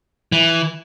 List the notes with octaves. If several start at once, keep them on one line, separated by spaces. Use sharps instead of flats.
E3